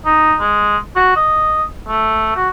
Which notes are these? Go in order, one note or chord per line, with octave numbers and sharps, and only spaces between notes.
D#4
G#3
F#4
D#5
A3
F#4